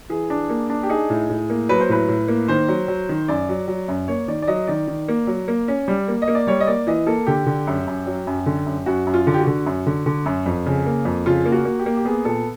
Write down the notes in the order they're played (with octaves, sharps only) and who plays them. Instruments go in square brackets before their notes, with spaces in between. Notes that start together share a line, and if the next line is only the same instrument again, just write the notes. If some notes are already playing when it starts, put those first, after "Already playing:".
[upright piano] E3 G#4
D4
A#3
D4
G4
D#4 G#4
A2
A2
A#3
F#3 B4
C5
A2 B4
A2
A#3
D#3 C5
F#3
F#3
D#3
F#2 D5
F#3
F#3
F#2
A#3 C#5
D#3 D5
D5
F#3 D#5
D#3 D5
D#3
A#3
F#3
A#3
C#4
G3
A#3
D#5
A#3
D5
G3 C#5
D#5
A#3 D5
E3 D#5
A#3 A4
D3 G4
D3
F#2
F#2
F#3
F#2
D3
F#2
F#2 F#4
F#2
F4
D3
G4
F#4
D3
F#2
D3
D3
F#2
F2
C#3
A#3
F2
C#3 F4
A#3
F#4
A#3
G4
A#3
G4
B3 G#4
A#2 A4